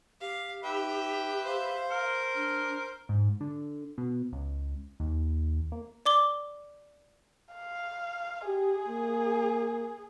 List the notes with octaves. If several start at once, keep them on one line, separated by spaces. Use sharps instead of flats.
G4 F5
D#4 B4 E5 G5
C5 F5
A#4 F6
D4 F6
G#2
D3
B2
C#2
D#2
A#3
D5 D6 G7
F5
G4 G#4
A#3